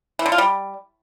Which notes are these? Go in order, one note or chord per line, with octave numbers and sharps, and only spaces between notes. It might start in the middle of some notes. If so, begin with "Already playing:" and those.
E3
D3
F4
G3